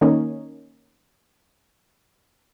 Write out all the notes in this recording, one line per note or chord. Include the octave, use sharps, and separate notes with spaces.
D#3 A#3 C#4 D#4